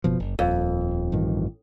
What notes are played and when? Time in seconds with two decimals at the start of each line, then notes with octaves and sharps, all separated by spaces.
0.04 F#1 B2 F3
0.20 F#1
0.39 D#1 F2
1.12 A1 G2 D#3